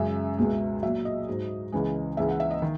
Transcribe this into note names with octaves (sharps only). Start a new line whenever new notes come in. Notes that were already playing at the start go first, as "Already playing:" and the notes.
Already playing: F#2 C#3 G#3 E5
C#2 B2 G#3
A#2 F#3 E5
D#5
G#2 F#3
C#2 C#3 E3 G#3
C#2 C#3 E3 G#3 E5
F#5
E5
D#5
D#3